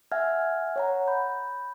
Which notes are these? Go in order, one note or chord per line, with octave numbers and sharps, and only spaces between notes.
E5 F#5 G#5 F6 G#6
C#5 F#5 A#5
B5 G6